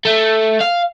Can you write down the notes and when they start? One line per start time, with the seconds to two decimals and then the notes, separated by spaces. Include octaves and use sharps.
0.05 A3
0.61 F5